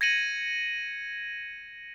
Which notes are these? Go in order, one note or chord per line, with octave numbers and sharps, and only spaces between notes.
G#6 A#6 C#7 D#7 F#7